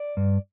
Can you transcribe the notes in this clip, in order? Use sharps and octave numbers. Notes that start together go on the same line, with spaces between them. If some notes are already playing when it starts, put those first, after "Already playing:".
Already playing: D5
G2